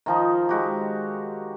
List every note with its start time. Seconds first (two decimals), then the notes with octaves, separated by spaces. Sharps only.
0.06 D#3 F3 D#4
0.49 G#3 F#4 G4